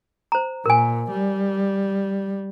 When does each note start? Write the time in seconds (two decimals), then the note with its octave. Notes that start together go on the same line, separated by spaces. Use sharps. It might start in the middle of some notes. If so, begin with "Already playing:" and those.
0.32 C5 A#5
0.66 A#2 A#4 G#5
1.11 G3